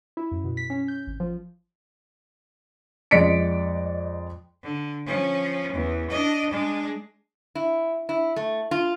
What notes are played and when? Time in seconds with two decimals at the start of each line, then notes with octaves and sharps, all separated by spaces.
0.17 E4
0.32 F#2
0.44 B2
0.57 B6
0.70 C#4
0.88 G6
1.07 G#1
1.20 F3
3.11 F2 G#3 D5 B6 C#7 D7
4.63 D3
5.06 F3 C#4
5.72 E2
6.10 D4 D#5
6.50 G#3 D4
7.55 E4
8.09 E4
8.36 A3
8.71 F4